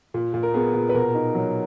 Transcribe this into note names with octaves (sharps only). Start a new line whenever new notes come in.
A#2
A#2
A#4
B3 G#4
A#2
B4
B2 A#4
D#4
F#3